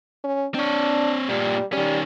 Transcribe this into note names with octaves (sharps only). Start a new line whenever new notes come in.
C#4
C4 D4 C#5
G2 A#2 G3
D#3 G3 C#4